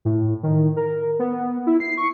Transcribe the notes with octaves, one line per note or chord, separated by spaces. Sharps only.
A2
D#3
A#4
B3
E4
C7
C#6